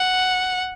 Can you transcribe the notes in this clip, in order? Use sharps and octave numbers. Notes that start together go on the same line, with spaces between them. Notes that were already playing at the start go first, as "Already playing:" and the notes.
Already playing: F#5